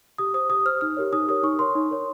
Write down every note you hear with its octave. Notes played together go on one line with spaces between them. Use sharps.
G4 D#6
C5 D#6
G4 D#6
C5 F6
D#4 F6
G4 A#4 C#5
D#4 D#6
G4 A#4 C#5 D#6
D#4 C#6
A#4 C#5 C6
D#4
A#4 C#5